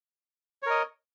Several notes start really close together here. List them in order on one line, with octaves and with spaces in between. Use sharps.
C#5 A#4 D#5